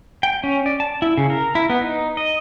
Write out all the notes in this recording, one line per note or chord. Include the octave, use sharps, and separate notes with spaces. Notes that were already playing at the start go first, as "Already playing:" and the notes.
G5
C#4
D5
A5
E4
C#3
A#4
E4
B3
D#4
D#5